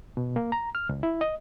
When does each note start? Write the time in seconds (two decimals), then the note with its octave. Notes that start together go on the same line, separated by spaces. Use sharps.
0.17 B2
0.36 A#3
0.52 A#5
0.75 F6
0.89 C#2
1.03 E4
1.21 D#5